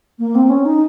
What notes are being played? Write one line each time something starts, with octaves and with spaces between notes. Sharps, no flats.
A#3
C4
C#4
D#4